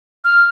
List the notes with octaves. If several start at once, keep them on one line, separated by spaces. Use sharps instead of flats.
F6